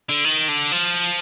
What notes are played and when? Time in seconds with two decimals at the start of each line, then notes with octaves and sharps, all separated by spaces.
0.09 D3
0.25 D#3
0.49 D3
0.72 F3